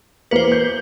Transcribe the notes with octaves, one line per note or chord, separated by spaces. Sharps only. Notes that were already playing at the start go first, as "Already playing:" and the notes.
E2 A#3 B4 C5 C#7
G6